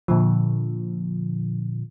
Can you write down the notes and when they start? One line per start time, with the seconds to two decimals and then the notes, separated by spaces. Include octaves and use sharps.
0.08 A#2 D3 F3